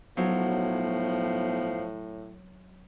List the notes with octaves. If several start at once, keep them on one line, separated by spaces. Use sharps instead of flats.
B1 A2 F3 F#3